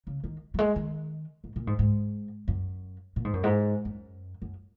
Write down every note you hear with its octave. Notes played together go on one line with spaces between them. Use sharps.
C#3
D#3
F#3
G#3
D#3
G#2
A#2
G#2
G#2
F#2
A#2
G#2
F#2
G#2
F#2
F#2